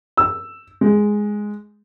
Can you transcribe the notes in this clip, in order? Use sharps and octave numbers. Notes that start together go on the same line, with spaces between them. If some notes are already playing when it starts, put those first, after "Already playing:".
E6
G#3